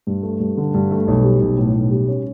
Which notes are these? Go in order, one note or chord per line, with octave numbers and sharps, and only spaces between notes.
G2
A3
G2
D3
G2
A3
B1
G3
B1
A2
B1
G3
C#4